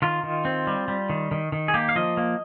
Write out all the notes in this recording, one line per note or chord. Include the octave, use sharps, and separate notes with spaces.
D#3 F4
D#3
C4
G3
G3
D#3
D#3
D#3
G#4
A#3 G4
F5
F3 D#5
A#3